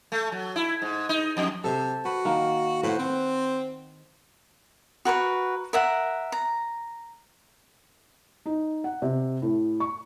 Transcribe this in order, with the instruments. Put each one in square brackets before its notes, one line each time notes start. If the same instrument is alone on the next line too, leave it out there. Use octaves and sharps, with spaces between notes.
[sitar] A3
F#3
E4
G#2
D#4
F2
[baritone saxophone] C3 [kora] A4 C5
[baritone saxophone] F#4 [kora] B4
[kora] D#3 A#3
[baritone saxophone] A2 [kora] B4 C5 F#5
[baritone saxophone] C4
[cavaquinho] F#4 A#4 B4 C#6
A#4 E5 F#5
A#5
[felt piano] D#4
F#5
C3
A2
C#6